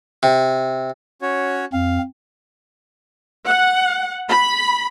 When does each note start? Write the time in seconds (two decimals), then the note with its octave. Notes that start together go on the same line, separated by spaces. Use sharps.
0.23 C3
1.22 C#4 F#4 C#5
1.73 F2 C4 F5
3.45 F#5
4.29 B5